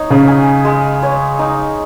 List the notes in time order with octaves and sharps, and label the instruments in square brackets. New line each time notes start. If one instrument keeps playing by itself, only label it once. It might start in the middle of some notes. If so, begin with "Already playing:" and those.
Already playing: [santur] D#4 C#5
[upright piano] C#3
[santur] G#4
G#3
C#5
D#4